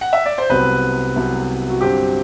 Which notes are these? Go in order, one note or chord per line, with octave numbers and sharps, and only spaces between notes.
F#5
E5
D5
C5
C2 C3 F#3 B3 B4
C2 C3 F#3 B3
F#4
G1 G2 F#3 C4 G4